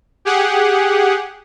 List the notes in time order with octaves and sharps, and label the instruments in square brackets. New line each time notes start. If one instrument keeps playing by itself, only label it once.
[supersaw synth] G4 G#4 F#5